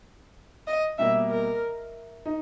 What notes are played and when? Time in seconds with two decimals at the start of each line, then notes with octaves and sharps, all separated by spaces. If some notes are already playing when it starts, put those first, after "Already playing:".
0.67 D#5
0.98 B2 G3 A#3 E5
1.30 A#4
2.26 D#4